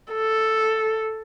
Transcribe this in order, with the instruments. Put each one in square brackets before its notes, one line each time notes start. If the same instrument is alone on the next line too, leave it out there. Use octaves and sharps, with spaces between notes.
[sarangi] A4